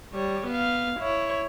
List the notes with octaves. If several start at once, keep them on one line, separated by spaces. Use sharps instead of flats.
G3 C#5
B3 F5
E4 C#5